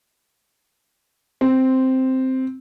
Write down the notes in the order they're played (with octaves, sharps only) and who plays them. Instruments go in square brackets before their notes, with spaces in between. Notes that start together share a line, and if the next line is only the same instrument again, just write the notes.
[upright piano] C4